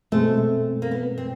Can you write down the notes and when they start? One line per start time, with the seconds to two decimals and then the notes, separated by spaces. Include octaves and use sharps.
0.12 B2 G#3 A3 C4
0.82 A#3
0.91 B3
1.18 C4